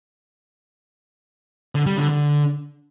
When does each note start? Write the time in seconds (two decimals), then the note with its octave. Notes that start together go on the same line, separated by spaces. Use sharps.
1.75 D3
1.86 G3
1.98 D3
2.09 D3